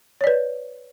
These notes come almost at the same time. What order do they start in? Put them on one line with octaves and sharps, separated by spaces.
C#5 D5 B4